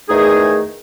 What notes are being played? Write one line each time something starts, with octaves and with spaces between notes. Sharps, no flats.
E2 D#3 A3 D#4 G#4